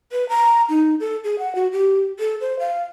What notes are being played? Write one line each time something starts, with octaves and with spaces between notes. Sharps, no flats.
B4
A#5
D#4
A4
G#4
F#5
F#4
G4
A4
C5
F5